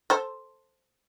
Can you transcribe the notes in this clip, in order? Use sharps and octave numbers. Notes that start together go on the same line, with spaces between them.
A4 C5